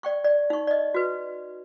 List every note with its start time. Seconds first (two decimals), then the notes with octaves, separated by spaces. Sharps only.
0.03 D5 G5 C#6
0.24 D5
0.50 D#4 C#6
0.67 D5 D#5
0.94 F#4 B4